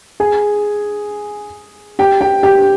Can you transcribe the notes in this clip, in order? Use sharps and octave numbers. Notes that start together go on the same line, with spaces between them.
G#4 G#5
G4 G5
G4 G5
G4 G5